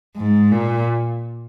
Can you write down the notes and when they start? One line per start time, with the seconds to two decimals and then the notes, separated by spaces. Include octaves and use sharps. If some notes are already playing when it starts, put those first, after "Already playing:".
0.16 G#2
0.52 A#2